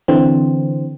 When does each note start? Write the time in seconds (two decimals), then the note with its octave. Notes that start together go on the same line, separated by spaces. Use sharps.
0.08 D3 E3 C4